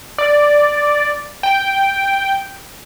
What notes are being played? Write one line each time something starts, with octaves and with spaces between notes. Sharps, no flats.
D5
G5